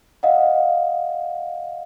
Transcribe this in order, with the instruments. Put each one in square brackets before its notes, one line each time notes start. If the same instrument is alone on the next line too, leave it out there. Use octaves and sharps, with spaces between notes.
[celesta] D#5 F5 F#5